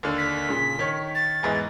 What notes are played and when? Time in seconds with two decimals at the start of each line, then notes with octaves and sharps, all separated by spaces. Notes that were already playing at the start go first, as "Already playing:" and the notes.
0.03 D#2 D3
0.18 B6
0.49 A#2 C#3
0.79 D#3 C#5
1.15 A6
1.43 E2 G#2 E3